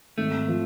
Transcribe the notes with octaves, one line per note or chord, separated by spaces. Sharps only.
G#1 A3
F3